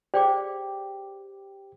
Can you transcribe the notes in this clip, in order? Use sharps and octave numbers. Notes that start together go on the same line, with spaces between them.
G4 G#4 C5 D5 G5 D6